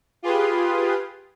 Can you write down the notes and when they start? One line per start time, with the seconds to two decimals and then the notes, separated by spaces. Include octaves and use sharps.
0.23 F4 G4 G#4 B4 C6 D#6